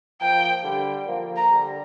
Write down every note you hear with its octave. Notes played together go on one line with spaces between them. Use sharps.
F3 A#3 G5
D3 G3
F3 A#3
A#5
D3 G3